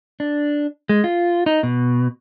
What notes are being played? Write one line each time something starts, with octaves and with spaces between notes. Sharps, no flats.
D4
G#3
F4
D#4
B2